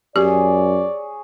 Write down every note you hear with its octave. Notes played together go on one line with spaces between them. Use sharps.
F#2 G4 G#4 C#5 D5